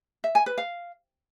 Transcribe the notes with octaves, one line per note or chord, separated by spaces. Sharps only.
E5
G#5
B4
F5